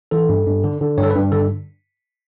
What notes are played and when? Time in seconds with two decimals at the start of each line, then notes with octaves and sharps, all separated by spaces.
0.11 E3 A4
0.29 G2
0.46 G2
0.64 D3
0.81 D3
0.98 G2 C#5
1.03 A4
1.10 B4
1.15 G2
1.32 D3 A4